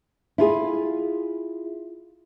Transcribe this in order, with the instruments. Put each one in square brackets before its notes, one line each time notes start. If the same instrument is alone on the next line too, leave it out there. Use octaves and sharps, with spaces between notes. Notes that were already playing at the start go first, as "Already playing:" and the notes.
[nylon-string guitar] E4 F4 G#4